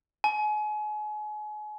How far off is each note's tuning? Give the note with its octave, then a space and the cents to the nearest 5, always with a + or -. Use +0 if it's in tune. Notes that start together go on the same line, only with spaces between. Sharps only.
G#5 +35